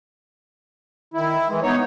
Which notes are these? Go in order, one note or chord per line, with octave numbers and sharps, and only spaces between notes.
D#3 E4
E3 G#3
B3 D#4 C#5